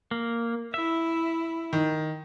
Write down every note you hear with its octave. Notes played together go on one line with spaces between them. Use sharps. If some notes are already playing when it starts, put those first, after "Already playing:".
A#3
E4 E5
D#3